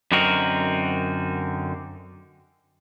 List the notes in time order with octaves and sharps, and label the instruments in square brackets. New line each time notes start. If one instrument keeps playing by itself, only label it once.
[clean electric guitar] F#2 D3 C4 D#4 F#4 A#4